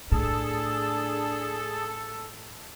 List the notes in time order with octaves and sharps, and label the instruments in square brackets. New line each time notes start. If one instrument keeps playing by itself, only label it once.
[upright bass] A2 [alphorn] D4 [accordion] G#4 A5 [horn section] A4